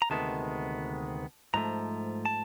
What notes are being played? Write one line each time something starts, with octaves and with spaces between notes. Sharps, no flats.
A#5
D2 C3 D#3 G#3 B3 A5
G#2 F3 A3 A#5
A5